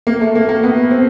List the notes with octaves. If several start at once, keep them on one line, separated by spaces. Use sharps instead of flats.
A#3
A3
A#3
A#3
B3
C4